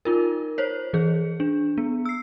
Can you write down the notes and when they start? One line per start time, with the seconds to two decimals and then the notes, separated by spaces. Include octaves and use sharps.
0.05 D#4 F4 A#4
0.58 C5 C#5
0.93 E3 G#4
1.40 D4
1.78 B3
2.05 E6 C7